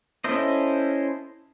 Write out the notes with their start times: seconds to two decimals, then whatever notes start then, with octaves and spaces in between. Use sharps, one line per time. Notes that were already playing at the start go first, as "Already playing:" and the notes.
0.24 C#4 E4 A4 C5 D#5